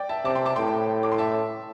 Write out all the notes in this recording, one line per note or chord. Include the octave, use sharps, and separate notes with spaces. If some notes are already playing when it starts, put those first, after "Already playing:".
Already playing: D5 G5
E5 A5
C3 A5 D6
G5 C6
A5 D6
A2 G5 C6
D6
C6
E5 A5